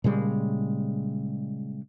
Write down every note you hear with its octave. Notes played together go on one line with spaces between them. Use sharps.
A#2 C#3 G3 G#3